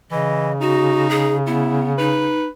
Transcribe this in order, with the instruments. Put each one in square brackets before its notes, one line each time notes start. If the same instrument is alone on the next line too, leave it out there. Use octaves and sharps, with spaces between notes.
[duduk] C#3 [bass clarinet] E3 [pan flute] D#5
[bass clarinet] D#4 [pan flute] F#4
[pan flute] G#4
[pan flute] B3 [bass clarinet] E4
[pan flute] D#4 [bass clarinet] B4